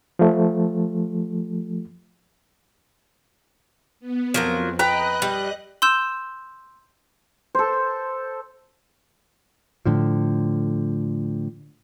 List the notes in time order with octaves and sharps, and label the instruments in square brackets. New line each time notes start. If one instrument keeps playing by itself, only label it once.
[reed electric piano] F3 A3
[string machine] B3
[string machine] F2 [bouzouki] F3 F#3 A#4
[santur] B4 [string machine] D#5 F#6 [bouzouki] G5 A#5
[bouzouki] G3
[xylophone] C6 E6 G6 E7
[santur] A4 C5
[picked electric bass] A2 D3 F3